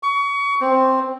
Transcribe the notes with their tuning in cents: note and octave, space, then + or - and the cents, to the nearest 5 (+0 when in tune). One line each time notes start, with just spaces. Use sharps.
C#6 +30
C4 +5